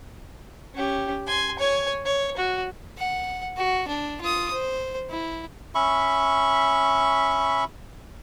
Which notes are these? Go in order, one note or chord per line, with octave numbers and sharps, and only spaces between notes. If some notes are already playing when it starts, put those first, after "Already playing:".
C#4 G4
G#5 C6
C#5 G#5
C#5
F#4
F#5
F#4
D4
F4 D#6
C5
E4
C#4 E5 B5 C#6